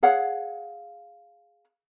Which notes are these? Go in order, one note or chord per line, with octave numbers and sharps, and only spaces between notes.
G#4 C#5 F5 F#5